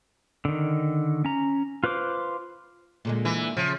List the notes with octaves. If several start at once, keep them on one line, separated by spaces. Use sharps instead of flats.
D3 D#3
C#4 A#5
F4 B4 C5 D6
A#2 D3 G#3
E3
C#3 F3